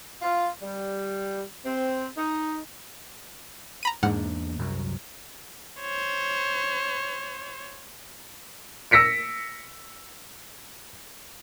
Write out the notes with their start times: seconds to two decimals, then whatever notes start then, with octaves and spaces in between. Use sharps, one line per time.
0.22 F4
0.62 G3
1.66 C4
2.17 D#4
3.83 A#5 B5 D#7
4.03 E2 G#2 A#3 D4 F#5 F6
4.59 C2 F#2 F#3
5.80 C5 C#5
8.91 E6 A#6 B6 C#7 D7